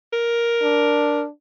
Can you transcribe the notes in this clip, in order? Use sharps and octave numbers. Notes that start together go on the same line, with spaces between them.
A#4
D4